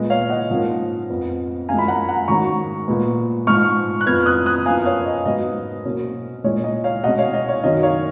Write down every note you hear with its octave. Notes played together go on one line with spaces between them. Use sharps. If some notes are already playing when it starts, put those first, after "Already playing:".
Already playing: A#2 G#3 B3
C#5 F5
D#5 F#5
G#2 F3 A#3 C#4
F2 F3 B3
F#2 F3 G#3 F5 G#5
B5
F#5 A#5
F#5 A#5
G#2 D#3 F#3 C#4 A#5 C#6
A#2 G#3 B3
G#2 F3 G#3 C#6 F6
F#6
F2 F3 B3 F6 G#6
D#6 F#6
D#6 F#6
F#2 F3 B3 F5 G#5
C#5 F5
D#5
G#2 F#3 B3 D#5
B2 F#3 A#3 C#4
A#2 G#3 C#4 C#5
D#5
C#5 F5
B2 G#3 C#4 D#5 F#5
C#5 F5
D#5
C#5
F#2 D#3 F#3 C#4 D#5
C#5 F5